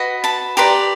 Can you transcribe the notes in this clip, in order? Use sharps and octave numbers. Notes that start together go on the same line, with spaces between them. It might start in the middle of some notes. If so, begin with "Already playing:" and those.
Already playing: F#4 B4 D#5
A5 B5
G4 B4 D5 A#5 C6